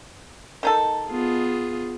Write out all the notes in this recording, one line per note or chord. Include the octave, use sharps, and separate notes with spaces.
D#3 D#4 A4
B3 F4 G#4